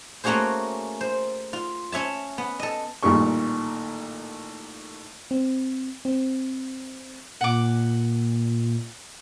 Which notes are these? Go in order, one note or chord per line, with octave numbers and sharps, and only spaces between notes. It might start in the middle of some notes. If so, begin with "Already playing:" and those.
A3 A#3 C#4 F#4 G#4 C5
C5
F4
C#4 C#5 E5 A5
B3
A4 D#5
A1 A#2 D#3 G3 C#6
C4
C4
A#2 F#5 D6